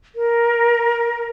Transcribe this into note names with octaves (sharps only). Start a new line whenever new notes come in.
A#4